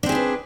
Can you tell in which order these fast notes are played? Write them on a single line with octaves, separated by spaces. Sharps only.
D4 C4 G#4 E4 B4